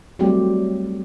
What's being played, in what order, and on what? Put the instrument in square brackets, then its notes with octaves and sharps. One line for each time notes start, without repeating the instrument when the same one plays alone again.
[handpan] F#3 G3 A3 C4 G4